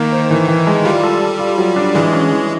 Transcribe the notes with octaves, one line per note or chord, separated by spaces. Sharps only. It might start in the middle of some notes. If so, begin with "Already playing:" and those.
Already playing: D#3 A#3
C5
E3
E3
G#3
G3 F4
A4
A4
F4
F#3
D4
E3 G#3
C#4
E3